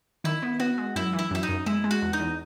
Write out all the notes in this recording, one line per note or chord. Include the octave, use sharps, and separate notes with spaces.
D#3 E4
B3
B3 F#4
G#3
F#2 E4
E3
E4
F#2 E4
D#4
F#2
G#3 E4
G#3
F#4
E2
D#4
E2